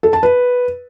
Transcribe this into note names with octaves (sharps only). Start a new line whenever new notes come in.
A4
A5
B4